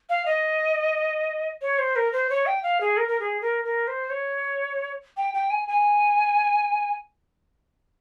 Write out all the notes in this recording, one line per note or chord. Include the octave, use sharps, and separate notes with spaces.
F5
D#5
C#5
C5
A#4
C5
C#5
G5
F5
G#4
A#4
A#4
G#4
A#4
A#4
C5
C#5
G5
G5
G#5
G#5